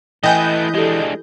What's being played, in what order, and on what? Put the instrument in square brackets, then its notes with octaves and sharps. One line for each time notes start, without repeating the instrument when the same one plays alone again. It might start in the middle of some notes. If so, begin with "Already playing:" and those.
[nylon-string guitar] E3 [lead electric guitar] A3 B4 [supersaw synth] D#5 G6 [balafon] G5 G#5
[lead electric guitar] G#3 D4 [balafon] G4 A4